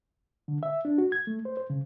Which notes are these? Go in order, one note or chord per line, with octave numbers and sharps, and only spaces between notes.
D3
E5
D4
F#4
G#6
A3
C5
C5
C#3